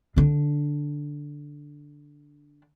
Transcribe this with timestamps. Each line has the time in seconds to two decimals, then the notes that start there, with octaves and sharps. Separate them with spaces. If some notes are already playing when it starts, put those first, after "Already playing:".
0.16 D3 D4